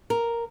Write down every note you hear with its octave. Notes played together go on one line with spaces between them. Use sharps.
A#4